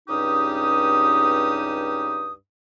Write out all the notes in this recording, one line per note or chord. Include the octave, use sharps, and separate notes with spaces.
C#2 G2 C#4 D#4 G4 D#6